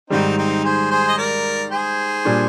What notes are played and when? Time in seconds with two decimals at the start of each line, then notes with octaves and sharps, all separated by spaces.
0.10 G#2 D#3 G3 C4 D#4
0.38 C4 D#4
0.64 G#4 C5
0.91 G#4 C5
1.09 D#5
1.18 A#4 D5
1.72 G#4 C5
2.25 A#2 G3 D4